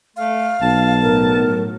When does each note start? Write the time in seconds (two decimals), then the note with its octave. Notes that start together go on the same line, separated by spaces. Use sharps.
0.17 A3 F5
0.62 B1 A5
1.02 A2 F#3 A#4